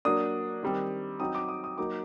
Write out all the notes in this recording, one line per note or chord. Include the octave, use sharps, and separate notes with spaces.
F#3 A#3 D4 D#6
D#3 G3 C4
F#3 C4 D#4 D#6
D6
D#6
D#6
F#3 A#3 D#4 D6